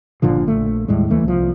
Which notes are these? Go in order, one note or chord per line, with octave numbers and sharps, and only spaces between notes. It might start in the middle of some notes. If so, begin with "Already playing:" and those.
G1 A#2 D3 F3
A#1 A3
D#2 A2 G3 G#3
D2 E3 A3 A#3
C2 F3